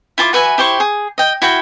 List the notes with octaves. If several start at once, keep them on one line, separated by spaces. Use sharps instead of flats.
E4 F4 A5 D6
F#4 B4 E5 G#5
E4 G4 C5 C#6
G#4
D#5 G5
E4 F#4 G5